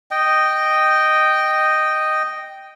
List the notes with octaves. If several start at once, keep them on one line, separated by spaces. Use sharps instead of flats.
D#5 G5